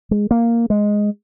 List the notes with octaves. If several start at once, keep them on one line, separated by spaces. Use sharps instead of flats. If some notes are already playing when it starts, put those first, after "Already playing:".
G#3
A#3
G#3